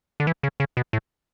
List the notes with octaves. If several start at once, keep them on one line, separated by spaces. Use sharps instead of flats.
D3
E3
C#3
C#3
B2
A2